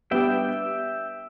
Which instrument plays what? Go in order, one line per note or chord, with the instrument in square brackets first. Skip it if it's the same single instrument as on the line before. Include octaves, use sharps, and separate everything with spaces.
[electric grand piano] G3 B3 D4 G4 [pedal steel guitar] E5 G5